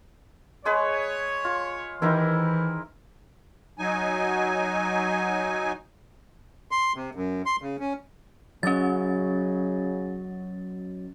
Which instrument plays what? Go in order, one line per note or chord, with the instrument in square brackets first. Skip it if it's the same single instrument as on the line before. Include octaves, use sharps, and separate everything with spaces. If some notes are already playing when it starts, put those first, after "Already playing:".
[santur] G#3 G#4 B4 [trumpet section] C#5
[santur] F4
[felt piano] D#3 G4 D#5 [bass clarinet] E3 [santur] E4 A#4 C5
[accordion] F#3 D#4 G#5
[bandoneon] C6
C3
F#2
C6
C#3
C#4
[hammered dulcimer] F#2 D#5 [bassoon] C#3 [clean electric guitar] F#3 [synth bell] C#4 A6